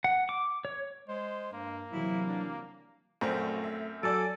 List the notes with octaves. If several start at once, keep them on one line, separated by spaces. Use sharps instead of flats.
F#5
D6
C#5
G#3 C5
G2 A#3
C3 E3 F#3 E4
D4
A#1 F#2 A3 C4
E5
F#3 A4 D5 G#5 D7